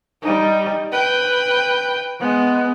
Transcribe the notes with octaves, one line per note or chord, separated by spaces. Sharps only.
G3 D#4
B4 G5
G#3 B3